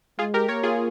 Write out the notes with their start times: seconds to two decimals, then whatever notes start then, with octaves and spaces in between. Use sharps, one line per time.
0.19 G#3 F4 G#4
0.34 G4 A#4
0.48 A#3 A#4 C#5
0.63 F4 G#4